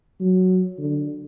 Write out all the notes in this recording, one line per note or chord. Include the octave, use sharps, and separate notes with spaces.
F#3
D3